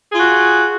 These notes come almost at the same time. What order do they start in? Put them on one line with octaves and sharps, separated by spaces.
G#4 F4 F#4